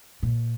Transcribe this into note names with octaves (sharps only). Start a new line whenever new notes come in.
A#2